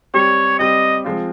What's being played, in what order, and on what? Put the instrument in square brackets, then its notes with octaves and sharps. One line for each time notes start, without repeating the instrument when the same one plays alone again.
[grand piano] G3 C4 G4 [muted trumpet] C#5
[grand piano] G3 C4 G4 [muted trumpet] D#5
[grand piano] F3 G#3 C4 F4